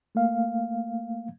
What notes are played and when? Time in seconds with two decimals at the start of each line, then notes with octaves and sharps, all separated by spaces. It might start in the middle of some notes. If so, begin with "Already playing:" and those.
0.15 A3 A#3 F5